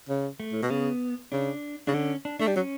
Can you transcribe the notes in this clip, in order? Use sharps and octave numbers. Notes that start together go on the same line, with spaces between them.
C#3
A3
A2
B2
C#3 B3
C#3 D4
C#3 D4
D3 C#4
D4
A3 D4
G3
F#3 C#4